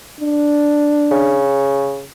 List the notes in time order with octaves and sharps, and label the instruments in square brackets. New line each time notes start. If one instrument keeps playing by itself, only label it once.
[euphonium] D4
[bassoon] C#3